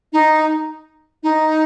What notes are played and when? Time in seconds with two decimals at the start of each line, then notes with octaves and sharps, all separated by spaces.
0.13 D#4
1.23 D#4